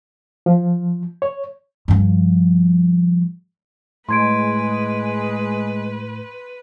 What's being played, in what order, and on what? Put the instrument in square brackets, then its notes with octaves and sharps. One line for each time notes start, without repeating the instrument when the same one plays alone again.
[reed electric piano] F3
C#5
[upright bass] G2 F3
[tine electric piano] A2 [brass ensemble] G#3 [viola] B4 [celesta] C6 G#6 D7